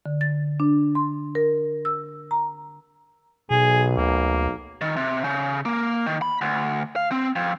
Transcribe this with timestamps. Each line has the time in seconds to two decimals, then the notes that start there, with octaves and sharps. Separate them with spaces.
0.06 D3
0.21 A6
0.60 D4
0.95 C6
1.35 A#4
1.85 E6
2.31 A#5
3.51 B1 B2 G#4
3.98 D2 A#3
4.81 D#3
4.96 C3
5.24 C#3
5.65 A#3
6.06 D#3
6.22 B5
6.41 D2
6.96 F5
7.12 C4
7.36 F2